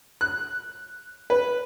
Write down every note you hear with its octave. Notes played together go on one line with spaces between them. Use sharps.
F#6
B4